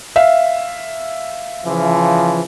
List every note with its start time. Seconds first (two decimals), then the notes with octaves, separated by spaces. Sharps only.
0.16 E5 F5
1.66 C#3 E3 F3